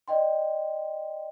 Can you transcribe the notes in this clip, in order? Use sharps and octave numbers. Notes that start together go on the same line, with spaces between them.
D5 D#5 G5 C6